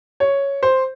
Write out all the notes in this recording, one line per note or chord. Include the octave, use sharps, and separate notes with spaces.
C#5
C5